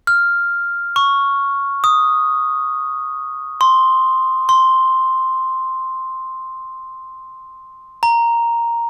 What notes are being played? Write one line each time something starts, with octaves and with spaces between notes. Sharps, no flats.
F6
C#6
D#6
C6
C6
A#5